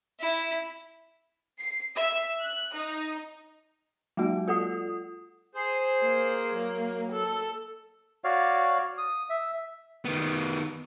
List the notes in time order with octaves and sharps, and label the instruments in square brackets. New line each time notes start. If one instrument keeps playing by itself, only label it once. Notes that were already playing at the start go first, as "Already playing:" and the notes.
[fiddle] E4
[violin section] C7
E5
F#6
D#4
[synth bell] F#3 G#3 A#3 F#4
F4 A4 F#5 D#6
[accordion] G#4 C5
[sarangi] A#3
[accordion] F#3
[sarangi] A4
[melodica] F#4 C#5 D5 F5
D#6
E5
[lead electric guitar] D#3 B3